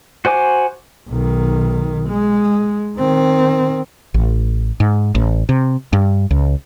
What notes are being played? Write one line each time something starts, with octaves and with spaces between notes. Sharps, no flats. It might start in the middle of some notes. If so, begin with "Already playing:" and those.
F#4 C5 G#5 D6
B1 D#3
G#3
D#3 C4
A1
G#2
A1
C3
G2
C#2